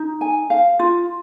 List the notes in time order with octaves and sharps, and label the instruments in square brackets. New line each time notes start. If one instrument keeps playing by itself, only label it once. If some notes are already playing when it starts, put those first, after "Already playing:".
Already playing: [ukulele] D#4
G#5
F5
F4